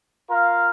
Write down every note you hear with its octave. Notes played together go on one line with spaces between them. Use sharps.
F4 A#4 F5